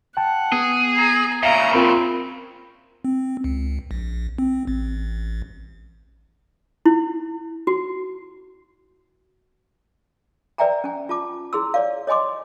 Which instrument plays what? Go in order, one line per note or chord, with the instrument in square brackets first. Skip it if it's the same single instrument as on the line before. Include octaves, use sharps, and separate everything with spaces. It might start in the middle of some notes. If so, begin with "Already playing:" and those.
[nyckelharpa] F#5 [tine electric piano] G5 A5
[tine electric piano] B3 [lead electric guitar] G#4
[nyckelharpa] G#5 A#5
[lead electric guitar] A#2 C#3 [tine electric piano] E5 F5 [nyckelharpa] A#5
[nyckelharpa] C4 [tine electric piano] F4 A#4 B5
[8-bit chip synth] C4
C#2
A#1
C4
A1
[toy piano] E4
F#4
B4 D5 E5 G5 G#5 A#5
C#4 G#5
F4 A5 D6
E4 G#4 C6 E6
C#5 D5 F5
C#5 D#5 G#5 C6 D6